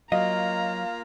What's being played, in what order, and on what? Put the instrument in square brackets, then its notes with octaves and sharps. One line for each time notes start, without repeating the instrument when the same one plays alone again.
[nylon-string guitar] F#3 [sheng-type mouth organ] A#3 F4 [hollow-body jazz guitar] D#5 F5 [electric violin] A#5